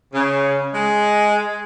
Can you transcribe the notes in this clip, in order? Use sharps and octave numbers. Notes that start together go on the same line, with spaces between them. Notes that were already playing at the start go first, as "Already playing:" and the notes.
C#3
G#3